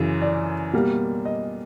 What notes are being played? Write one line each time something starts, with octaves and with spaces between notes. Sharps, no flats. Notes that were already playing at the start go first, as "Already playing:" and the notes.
Already playing: F#2 C#3 E3
D5
B2 G3 A#3
D#5